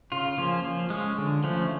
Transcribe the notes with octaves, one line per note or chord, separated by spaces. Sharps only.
C#3 F4
F3 A#3 C#4
F3
G#3 C#4
D3
F3 A3 C#4